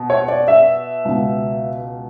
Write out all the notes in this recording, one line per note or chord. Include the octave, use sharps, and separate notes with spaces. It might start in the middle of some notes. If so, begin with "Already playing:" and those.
Already playing: B2
C#5
D5
E5
C#2 B2